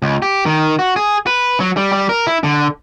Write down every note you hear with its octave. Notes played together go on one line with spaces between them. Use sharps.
C#2
G4
D#3
F#4
G#4
B4
F#3
G3
G3
A#4
E4
D3